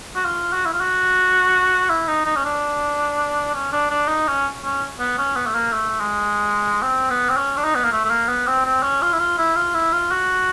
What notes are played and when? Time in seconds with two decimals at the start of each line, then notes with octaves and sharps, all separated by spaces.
0.15 F#4
0.25 F4
0.53 F#4
0.66 E4
0.73 F4
0.80 F#4
1.90 E4
2.08 D#4
2.26 D#4
2.36 C#4
2.45 D4
3.54 C#4
3.72 D4
3.90 D4
4.08 D#4
4.27 C#4
4.64 C#4
4.99 B3
5.18 C#4
5.36 B3
5.47 A3
5.55 A#3
5.73 A3
6.00 G#3
6.82 C4
7.10 B3
7.29 C4
7.37 C#4
7.57 D4
7.64 D#4
7.75 B3
7.84 A#3
7.92 A3
8.04 A3
8.10 A#3
8.28 B3
8.47 C4
8.65 C4
8.83 C#4
9.02 F4
9.13 E4
9.19 F4
9.38 E4
9.56 F4
9.74 E4
9.93 F4
10.11 F#4